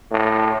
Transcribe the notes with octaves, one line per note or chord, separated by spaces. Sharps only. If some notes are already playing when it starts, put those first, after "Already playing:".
A2